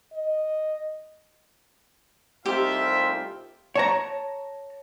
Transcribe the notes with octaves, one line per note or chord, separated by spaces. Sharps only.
D#5
C2 A3 C4 D#4 F4 G4 E5
C#5 A5 A#5